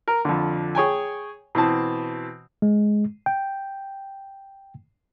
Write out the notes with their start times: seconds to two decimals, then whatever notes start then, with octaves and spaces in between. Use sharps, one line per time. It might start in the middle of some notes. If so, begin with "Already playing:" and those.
0.08 A#4
0.25 F2 D3
0.75 G#4 C#5 G5 G#5
1.55 B2 E3 C4 A5
2.62 G#3
3.26 G5